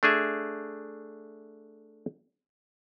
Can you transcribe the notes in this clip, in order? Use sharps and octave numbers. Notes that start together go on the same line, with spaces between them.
A3 D4 G#4 E5